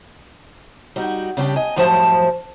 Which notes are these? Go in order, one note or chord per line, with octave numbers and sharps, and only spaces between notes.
G3 D#4 F#4
C#3 G3 D4 G4
D#5 G#5
F#2 A2 F3 G3 C5 A5